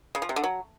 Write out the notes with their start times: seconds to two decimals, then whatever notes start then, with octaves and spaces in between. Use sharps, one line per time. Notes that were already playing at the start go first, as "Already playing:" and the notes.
0.15 C#3
0.22 F3
0.29 C3
0.36 D3
0.44 F#3